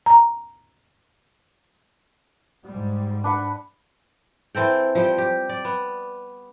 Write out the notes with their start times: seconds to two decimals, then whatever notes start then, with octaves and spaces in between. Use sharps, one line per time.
0.06 A#5
2.67 G#2 G3
3.24 D4 B4 F#5
4.55 E3 C4 A4 G5
4.95 F3 G3 G5
5.18 G4
5.49 D5
5.65 B3